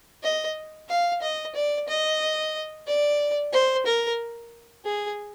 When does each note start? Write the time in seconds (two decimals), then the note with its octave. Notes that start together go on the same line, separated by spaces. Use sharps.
0.23 D#5
0.89 F5
1.22 D#5
1.55 D5
1.88 D#5
2.87 D5
3.53 C5
3.85 A#4
4.85 G#4